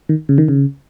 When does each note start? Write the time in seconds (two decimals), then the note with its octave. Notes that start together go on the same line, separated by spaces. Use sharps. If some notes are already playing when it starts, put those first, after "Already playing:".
0.09 D#3
0.29 C#3
0.38 D#3
0.48 C#3